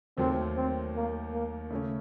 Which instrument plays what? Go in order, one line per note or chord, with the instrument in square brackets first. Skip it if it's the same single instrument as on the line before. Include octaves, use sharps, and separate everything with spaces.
[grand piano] D#2 D#3 F#3 A3 [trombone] C4
[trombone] C4
A#3
A#3
[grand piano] C#3 A3 C#4